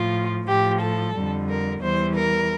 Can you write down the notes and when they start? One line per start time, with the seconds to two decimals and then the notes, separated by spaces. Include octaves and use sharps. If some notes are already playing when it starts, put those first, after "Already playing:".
Already playing: A2 F3 F4
0.47 A2 F3 G4
0.81 A4
1.14 F2 D3 G3
1.49 A#4
1.82 E2 E3 G3 C5
2.15 A#4